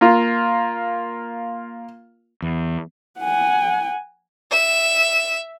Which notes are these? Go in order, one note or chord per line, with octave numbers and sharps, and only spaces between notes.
A#3 F4
E2
F#5 G#5
E5 E7